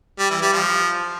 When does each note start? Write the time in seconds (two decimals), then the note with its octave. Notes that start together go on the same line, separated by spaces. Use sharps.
0.19 G3
0.30 E3
0.42 G3
0.53 F3